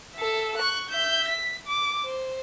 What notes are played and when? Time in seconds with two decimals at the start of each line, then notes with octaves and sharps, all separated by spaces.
0.15 A4 E5
0.58 C#6 F#6
0.90 E5 G6
1.28 B6
1.67 D6
2.03 C5